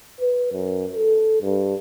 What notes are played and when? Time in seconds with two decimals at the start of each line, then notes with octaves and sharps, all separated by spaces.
0.21 B4
0.53 F#2
0.95 A4
1.42 G2